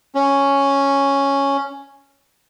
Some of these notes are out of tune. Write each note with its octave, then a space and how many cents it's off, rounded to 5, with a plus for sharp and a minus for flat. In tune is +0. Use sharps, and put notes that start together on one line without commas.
C#4 +0